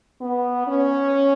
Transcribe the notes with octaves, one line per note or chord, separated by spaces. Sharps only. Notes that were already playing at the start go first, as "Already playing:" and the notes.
B3
C#4